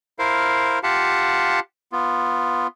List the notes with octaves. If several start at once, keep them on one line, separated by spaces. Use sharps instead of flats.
E4 A#4 C5 F5
F4 G4 F5 F#5 A5
B3 F4